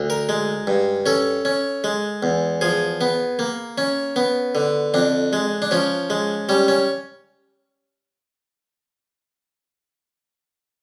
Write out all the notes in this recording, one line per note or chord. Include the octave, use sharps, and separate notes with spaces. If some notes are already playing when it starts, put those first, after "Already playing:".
Already playing: D2
A#4
G#3
G2
C#4 A4
C#4
G#3
E2
F3 G#4
B3
A#3
C#4
B3
D3
F2 D4
G#3
D4
F3 C#4
G#3
G3 C#4
C#4